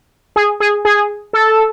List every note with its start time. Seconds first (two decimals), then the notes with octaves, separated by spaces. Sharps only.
0.36 G#4
0.60 G#4
0.85 G#4
1.33 A4